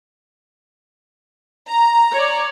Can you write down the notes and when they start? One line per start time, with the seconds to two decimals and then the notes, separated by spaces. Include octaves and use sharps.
1.68 A#5
2.12 C#5 D5